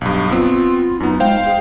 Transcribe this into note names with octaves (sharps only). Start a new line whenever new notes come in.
B1 G2
B3 C4 F4
F#2 B3 D#4
G#3 C5 F5 G5
G#4